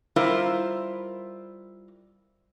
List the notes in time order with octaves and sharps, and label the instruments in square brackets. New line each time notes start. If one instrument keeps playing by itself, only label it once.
[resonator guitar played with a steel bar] G3 E4 F4 A#4 C5